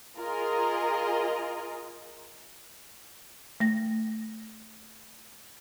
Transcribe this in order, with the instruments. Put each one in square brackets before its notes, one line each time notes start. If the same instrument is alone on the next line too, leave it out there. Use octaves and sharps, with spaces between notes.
[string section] F4 G#4 A#4 D#5
[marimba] A3 A#6